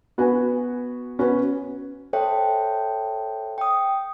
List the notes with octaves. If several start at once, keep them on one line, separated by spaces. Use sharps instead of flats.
B3 F#4 B4 G#5
B3 C#4 F#4 B4
A4 C5 C#5 E5 G5 A5
G5 D#6